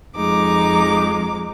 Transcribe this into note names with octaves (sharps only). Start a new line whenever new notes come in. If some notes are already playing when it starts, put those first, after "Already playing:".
F2 G#3 D#4 D6